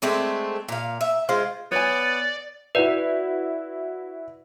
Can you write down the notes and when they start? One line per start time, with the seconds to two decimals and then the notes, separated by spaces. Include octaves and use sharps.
0.02 G#3 A3 C4 D4
0.69 A#2 F5
1.01 E5
1.29 G#3 F4 C5
1.72 B3 C#5 D5 G#5
2.75 E4 F#4 B4 D5 E5